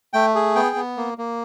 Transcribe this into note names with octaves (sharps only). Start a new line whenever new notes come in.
A3 G5
G#4
B3 G5
B3
A#3
A#3